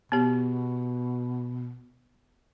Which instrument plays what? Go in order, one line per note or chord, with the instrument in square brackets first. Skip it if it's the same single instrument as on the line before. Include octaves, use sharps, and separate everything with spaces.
[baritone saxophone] B2 [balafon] B3 G4